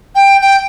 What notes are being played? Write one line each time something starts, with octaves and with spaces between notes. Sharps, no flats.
G5
G5